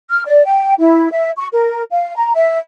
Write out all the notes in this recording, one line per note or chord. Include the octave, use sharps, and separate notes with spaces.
F6
D5
G5
E4
E5
C#6
A#4
F5
A#5
E5